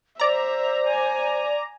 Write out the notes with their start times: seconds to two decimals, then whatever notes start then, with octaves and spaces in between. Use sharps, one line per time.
0.20 C5 D5 E5 A#5
0.87 G#5